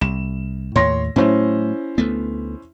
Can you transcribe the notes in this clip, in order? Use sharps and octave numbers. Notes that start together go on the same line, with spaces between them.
C2 E7
D#2 A2 C#5 C6 A#6
A2 F#3 A3 C#4 E4 C5
D2 A3 B3